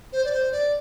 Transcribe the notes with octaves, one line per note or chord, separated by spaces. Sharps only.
C5
D5
C5
D5